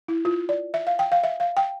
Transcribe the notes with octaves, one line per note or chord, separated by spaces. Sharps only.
E4
F4
D5
E5
F5
G5
F5
E5
F5
G5